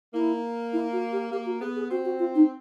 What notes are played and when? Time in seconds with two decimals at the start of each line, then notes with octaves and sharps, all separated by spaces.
0.14 A#3 E4
0.73 E4
0.92 F#4
1.12 G4
1.31 A#3 G4
1.46 F#4
1.61 B3 G#4
1.76 G#4
1.91 C4 F#4
2.05 F#4
2.19 F4
2.35 D#4